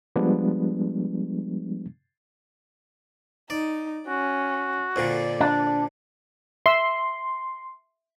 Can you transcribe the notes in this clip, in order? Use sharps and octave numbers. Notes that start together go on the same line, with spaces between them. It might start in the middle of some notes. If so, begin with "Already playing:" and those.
F3 G3 G#3 B3 D4
D#4 D5
C#4 F#4
F2 A#2 D3 D5
D4
E5 C6 E6